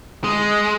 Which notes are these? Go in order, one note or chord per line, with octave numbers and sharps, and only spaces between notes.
G#3